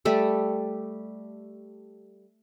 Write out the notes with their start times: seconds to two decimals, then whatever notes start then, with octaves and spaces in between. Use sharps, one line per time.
0.05 G3 A3 A4